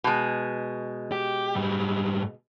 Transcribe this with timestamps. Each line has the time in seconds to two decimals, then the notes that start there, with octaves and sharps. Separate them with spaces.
0.04 B2 G#3
1.12 G4
1.55 G#2 G3